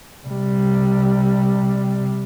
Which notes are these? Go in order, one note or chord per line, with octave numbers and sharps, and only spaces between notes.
C3 G3